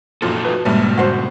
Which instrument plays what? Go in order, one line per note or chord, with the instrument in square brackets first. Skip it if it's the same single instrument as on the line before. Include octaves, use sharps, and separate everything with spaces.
[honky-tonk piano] F#2 A#2 F3 [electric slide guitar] D#4 F4 A4
[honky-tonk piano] F3 F#3 [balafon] F#4 B4
[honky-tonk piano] A#1 G2 [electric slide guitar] A#2 C#3 [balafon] G3 G#3
[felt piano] F#4 C5